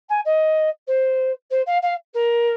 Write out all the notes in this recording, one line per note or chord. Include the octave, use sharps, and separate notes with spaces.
G#5
D#5
C5
C5
F5
F5
A#4